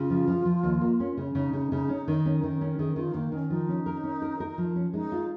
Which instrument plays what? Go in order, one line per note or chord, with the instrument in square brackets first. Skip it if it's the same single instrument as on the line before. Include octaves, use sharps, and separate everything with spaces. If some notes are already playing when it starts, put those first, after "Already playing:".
Already playing: [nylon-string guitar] C#3 [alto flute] F4
[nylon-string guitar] F3
F3
F3
D#2
A#3
C#4
C#3
[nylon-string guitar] C#3 [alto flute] D#4
[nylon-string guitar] C#3
C#3
C#4
D#3
C#4
D#3
C#4
[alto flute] A#4
[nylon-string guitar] D#3 [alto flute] G#4
[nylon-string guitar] D#3 [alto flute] F4
[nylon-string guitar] D#3 [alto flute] A#3
[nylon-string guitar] D#3 [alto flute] C#4
[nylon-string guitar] F3 [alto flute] D#4
[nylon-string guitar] C#4
A#4
C#4
A#4
A#4
F3
C#4
[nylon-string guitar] G#3 [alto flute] D#4
[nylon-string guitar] F4